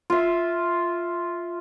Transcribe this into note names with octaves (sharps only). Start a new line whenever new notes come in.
F4 E5